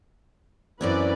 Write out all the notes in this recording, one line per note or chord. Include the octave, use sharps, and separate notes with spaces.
F#2 E3 C4 C#4 B4 D5